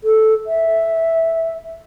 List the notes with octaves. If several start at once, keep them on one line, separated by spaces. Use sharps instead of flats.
A4
E5